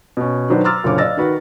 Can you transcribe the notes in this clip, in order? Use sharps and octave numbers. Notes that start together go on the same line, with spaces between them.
B2 C#4
D#3 F#3 D4 B4 C5
A#5 C6 D6 E6 F6 A6
F#1 A#2 D3 C#5 D6
D5 D#5 F5 E6 A6 A#6
D#3 F#4 B4